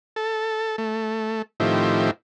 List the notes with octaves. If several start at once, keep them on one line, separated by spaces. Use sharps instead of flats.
A4
A3
A2 D#3 F3 C4 E4 G4